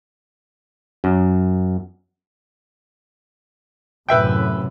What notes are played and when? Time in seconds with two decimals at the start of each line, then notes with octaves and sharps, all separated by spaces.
1.04 F#2
4.09 F#2 A2 C3 B4 E5 G5